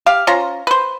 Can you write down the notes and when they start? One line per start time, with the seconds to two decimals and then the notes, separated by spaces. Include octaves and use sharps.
0.06 G4 F5
0.27 C#4 F4 C5 A#5
0.67 B4 C5